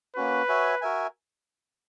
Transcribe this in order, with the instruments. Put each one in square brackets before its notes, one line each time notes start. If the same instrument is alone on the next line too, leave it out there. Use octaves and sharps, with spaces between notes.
[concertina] A#3 C#4 F#4 [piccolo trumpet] B4
[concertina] F#4 C#5 E5 G#5
F#4 A#4 E5 G#5